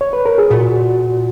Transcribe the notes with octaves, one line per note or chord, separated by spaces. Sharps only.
C#5
B4
A#4
G#4
A#2 F#4